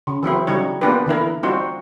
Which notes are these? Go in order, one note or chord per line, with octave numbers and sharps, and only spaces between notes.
C#3
E3 F#3 C4 E4
C#3 F#3 G3 D#4 C#5
A#3 B3 D4 F4 G4 B4
D3 E3 E4 A#4
G3 C4 D#4 F4 F#4 C5